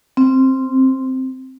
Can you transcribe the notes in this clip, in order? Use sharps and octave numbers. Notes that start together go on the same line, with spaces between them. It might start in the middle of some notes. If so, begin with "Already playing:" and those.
C4